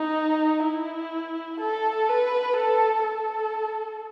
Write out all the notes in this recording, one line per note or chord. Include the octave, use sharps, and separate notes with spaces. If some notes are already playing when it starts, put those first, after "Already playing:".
Already playing: D#4
E4
A4
B4
A4
A4